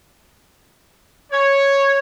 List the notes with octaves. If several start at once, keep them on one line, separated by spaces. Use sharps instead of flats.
C#5